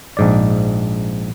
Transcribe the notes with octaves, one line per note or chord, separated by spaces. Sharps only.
A#1 G#2 D5